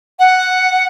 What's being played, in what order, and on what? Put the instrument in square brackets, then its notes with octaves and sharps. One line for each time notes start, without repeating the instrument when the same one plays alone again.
[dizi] F#5